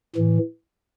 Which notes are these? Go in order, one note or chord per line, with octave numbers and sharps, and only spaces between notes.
A2 E3